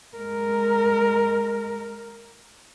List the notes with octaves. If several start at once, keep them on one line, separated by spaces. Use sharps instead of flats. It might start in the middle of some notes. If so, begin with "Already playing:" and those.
G#3 A#4